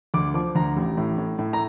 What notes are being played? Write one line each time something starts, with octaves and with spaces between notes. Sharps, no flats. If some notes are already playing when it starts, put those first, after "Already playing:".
D2 D6
F3 D6
D2 A#5
A1
A2
A2
A2
A#5